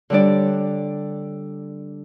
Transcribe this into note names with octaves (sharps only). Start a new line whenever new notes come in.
D3 G3 D4 D5